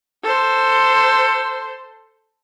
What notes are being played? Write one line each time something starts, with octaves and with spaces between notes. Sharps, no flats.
A4 C5